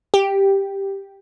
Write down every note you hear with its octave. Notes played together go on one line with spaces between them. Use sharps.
G4